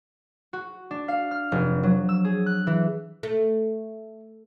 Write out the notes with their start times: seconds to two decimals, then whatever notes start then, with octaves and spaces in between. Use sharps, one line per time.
0.53 F#4
0.91 D4
1.08 F5
1.31 F6
1.52 F1
1.83 F#3
2.09 E6
2.24 G#4
2.46 F#6
2.67 E3
3.23 A3